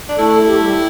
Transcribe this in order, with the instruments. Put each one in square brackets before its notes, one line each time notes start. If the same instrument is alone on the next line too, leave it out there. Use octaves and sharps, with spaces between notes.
[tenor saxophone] D4
[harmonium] A3 A4 [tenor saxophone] E4
[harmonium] G4
A4
G3 G4